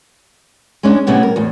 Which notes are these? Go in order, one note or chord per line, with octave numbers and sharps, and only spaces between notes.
G#3 C#4 D4
A2 C3 G3 B3 C#4 E4
A#4
E2 A2